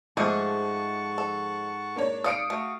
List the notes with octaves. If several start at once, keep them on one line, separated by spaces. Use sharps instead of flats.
G#2 F3 G#3 A3 G#4 F#5 A5 C#6
A4
A#3 D4 C#5
D5 F5 D#6 C#7 D7
A3 F#4 F5